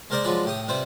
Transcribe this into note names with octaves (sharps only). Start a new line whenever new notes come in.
G#3 A#3 A#4 C5 D5 D#5
F3 F#3 G#3 F4 B4 D5
A2 G4 D#6
C3 G3 F4 B4 C5